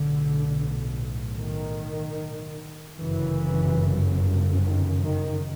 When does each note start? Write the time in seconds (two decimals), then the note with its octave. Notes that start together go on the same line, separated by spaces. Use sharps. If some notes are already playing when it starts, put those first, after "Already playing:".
Already playing: B1 A2 D3
1.38 D#3
2.99 G1 F#2 C#3 E3
4.63 D#3
5.03 D#3